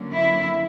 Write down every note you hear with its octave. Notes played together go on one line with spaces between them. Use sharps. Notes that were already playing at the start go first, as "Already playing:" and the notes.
Already playing: D3 F#3 A#3 C#4
E4 E5